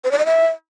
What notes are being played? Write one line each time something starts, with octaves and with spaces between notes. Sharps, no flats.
C5
D5
D#5
E5